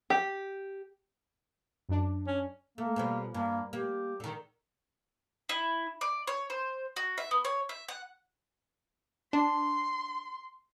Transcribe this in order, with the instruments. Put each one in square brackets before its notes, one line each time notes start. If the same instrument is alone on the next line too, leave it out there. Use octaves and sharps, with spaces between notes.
[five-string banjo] G4
[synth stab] F#2 D4
[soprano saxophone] C#4
[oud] A3 [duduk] A#3
[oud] B2 F3 G3
[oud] G2 [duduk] A#3
[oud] A#3 [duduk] G4
[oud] D3 D#3
[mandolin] E4
D5
C#5
C5
F#4
E5
B3
C#5
E5
F#5
[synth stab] D4 [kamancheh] C6